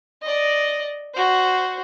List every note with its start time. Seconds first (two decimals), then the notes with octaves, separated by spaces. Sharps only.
0.22 D5 D#5
1.14 F#4 C5